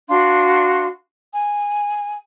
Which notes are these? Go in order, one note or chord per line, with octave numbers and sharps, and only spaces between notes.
D4 F#4 F5 C6
G#5